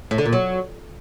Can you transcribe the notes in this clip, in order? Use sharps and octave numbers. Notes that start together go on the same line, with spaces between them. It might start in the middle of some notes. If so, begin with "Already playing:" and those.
A2
D3
A#2
F#3